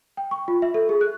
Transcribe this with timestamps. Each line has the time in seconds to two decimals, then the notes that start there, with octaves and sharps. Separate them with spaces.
0.17 G5
0.31 C#6
0.48 F4
0.62 E5
0.74 A4
0.89 G#4
1.01 F#6